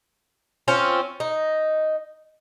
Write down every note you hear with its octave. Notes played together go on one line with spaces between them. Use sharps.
C4 C#4 F4
D#4